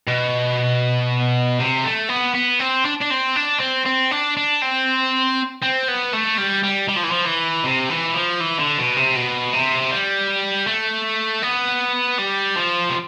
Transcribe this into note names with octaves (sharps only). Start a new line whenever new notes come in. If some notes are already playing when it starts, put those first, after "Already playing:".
B2
C3
A3
B3
B3
C4
D4
D4
C4
D4
C4
C4
D4
D4
C4
C4
B3
A3
G3
G3
G3
F3
E3
F3
E3
C3
E3
F3
E3
D3
B2
C3
B2
C3
G3
A3
B3
G3
F3
C3